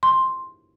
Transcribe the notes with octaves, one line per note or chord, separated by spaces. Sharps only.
C6